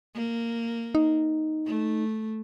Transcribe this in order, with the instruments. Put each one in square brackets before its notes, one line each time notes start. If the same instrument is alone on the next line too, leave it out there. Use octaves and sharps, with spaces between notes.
[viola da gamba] A#3
[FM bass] D#4
[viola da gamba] A3